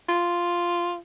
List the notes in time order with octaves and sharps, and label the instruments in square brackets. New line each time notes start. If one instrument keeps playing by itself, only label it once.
[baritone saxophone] F4